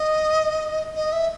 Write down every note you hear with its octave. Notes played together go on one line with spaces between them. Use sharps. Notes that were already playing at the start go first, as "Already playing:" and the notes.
Already playing: D#5
D#5
E5